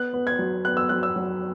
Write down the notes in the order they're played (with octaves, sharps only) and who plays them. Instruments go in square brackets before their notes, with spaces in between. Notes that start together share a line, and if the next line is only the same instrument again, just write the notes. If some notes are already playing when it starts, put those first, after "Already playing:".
Already playing: [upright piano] B3 F#6
B3
G#6
F#3
B3 F#6
E6
F#3 F#6
E6
F#3